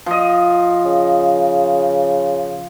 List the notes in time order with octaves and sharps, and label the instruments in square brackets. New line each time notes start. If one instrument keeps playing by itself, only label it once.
[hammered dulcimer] F3 D#5
[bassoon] C#3